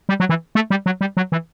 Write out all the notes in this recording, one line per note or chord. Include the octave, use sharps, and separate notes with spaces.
G3
F#3
E3
A3
G3
F#3
G3
F#3
E3